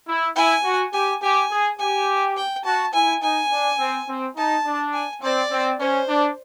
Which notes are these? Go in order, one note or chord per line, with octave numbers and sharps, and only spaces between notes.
E4
E4 G#5
F#4
G4 G#5
G4 G#5
G#4
G4 G#5
G5
F#4 A5
E4 G#5
D#4 G#5
D4
C4
C4
D#4 A5
D4
G#5
C4 D5
C4
C#4 C5
D4